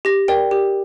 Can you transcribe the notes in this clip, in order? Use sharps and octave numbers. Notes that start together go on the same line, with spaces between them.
G4 A#6
A#4 D5 G5
G4